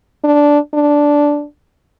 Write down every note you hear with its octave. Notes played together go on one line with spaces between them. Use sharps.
D4
D4